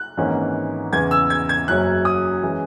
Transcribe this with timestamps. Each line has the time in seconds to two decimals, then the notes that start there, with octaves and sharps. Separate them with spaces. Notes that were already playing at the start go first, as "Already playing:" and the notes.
Already playing: F#6
0.17 G#1 G#2 E3 A#3 C#4
0.93 E2 C#3 E3 B3 G#6
1.11 E6
1.30 G#6
1.49 G#6
1.68 F#1 F#2 C#3 F#3 C#4 F#6
2.05 D#6
2.43 E3 G#3 C#4